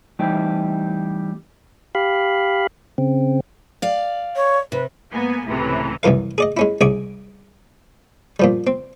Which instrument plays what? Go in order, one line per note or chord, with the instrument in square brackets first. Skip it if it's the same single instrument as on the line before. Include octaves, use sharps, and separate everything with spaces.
[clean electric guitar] E3 G3 A3 C4 D#4 G4
[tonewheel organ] G4 F5 B5
C#3 C4
[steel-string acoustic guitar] D5 F5
[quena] C#5
[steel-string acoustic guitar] C3 [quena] B4
[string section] G#2 A#3 B3 G#5
C#2 A2 C3 E3
[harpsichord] C2 F#2 E3 A#4 F5
G#4 D5 D#5
G#3 C#4 E4
C2 C#4 G#4 G#5 D6
A#2 F3 G3
C4